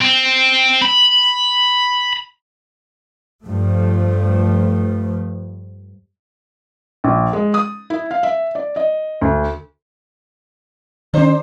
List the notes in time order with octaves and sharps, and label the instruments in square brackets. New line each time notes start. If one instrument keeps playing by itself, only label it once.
[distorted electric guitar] C4
B5
[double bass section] G2 F3 A3
[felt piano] A#1
G#3
D#6
E4
F5
E5
D5
D#5
D2
[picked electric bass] D#3 C#4 [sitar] D4 G4 C5